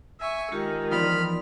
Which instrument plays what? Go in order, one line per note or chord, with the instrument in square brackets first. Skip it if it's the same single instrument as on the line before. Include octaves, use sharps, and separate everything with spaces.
[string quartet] E5 G#5 C#6
[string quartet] D#3 [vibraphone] G#3 F4 G4
[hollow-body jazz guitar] E2 F3 F4 [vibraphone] D#4 D5 C6 [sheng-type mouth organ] B5 F6